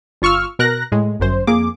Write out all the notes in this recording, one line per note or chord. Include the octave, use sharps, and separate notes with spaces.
G1 F4 C#6 E6 F6
B2 A#4 F#6 A#6
A2 G#3
G1 F#2 C5
F2 A#3 G#4 D6